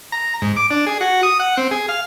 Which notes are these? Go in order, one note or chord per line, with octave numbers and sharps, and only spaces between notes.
A#5
G#2
D6
D4
G#4
F#4
D#6
F#5
C4
G#4
F5